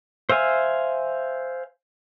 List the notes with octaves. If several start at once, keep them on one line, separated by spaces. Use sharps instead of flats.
C5 E5 F5 G#5